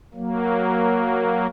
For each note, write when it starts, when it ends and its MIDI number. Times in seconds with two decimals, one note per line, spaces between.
0.14 1.47 54
0.14 1.47 58